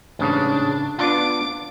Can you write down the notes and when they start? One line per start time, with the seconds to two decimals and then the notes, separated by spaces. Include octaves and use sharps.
0.19 A1 G#2 C#3 D4
0.98 B3 D4 F4 D6